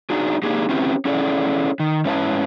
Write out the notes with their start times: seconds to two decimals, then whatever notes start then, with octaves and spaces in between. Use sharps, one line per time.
0.10 D4 D#4 F#4 G#4
0.43 A#3 D4 D#4 G4 G#4
0.69 C4 C#4 E4 G4 B4
1.05 C#4 E4 G#4 A4 D5
1.80 D#3
2.05 G#2 C#4 E4 A4 B4 A5